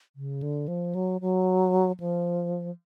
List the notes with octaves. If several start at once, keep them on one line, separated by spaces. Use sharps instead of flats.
C#3
D3
F3
F#3
F#3
F3